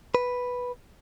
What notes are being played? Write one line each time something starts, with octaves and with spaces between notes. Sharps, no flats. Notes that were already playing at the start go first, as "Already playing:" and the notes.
B4